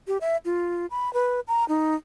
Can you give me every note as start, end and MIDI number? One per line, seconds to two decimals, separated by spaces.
0.07 0.18 67
0.21 0.37 76
0.45 0.86 65
0.90 1.12 83
1.13 1.40 71
1.47 1.66 82
1.68 1.95 63